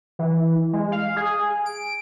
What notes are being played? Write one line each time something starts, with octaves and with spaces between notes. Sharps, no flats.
E3
G#3
F5
G#4
D7